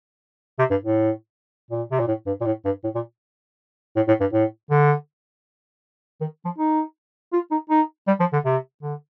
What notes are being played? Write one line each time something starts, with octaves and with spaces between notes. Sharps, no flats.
C3
G2
A2
A#2
C3
A#2
A2
G2
A#2
A2
G2
A2
A#2
A2
A2
G2
A2
D3
D#3
F3
D#4
F4
D#4
D#4
G3
F3
D3
C3
D3